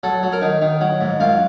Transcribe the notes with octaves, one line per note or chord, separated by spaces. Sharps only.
F#3 A4
F#3
A#4
D#3
D#3
F#3
G#2
F#2 F4